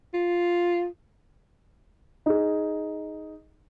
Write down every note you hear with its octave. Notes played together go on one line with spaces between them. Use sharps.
F4
D#4 G#4